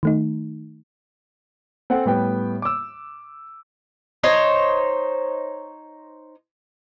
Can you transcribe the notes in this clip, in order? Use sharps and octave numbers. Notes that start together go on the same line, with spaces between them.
D#3 A3 D#4
C4 A4 F#5 G#5
A2 G3 B3 G5
D6 E6
D#4 C5 C#5